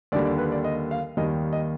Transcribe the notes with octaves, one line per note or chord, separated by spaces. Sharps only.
D#2 D3 G3 D5
D5
B4
D5
D#5
F5
D#2 D#3 G3 D#5
D#5